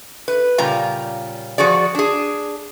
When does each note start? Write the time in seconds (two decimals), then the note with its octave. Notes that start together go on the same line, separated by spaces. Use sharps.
0.28 B4
0.58 A#2 C#3 G3 F4 A#5
1.58 F3 F#4 G#4 D5
1.95 D4 G#4